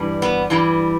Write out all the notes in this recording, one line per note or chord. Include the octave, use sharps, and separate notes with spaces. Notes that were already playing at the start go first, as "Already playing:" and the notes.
Already playing: G2 E3 G3
B3
G2 E3 G3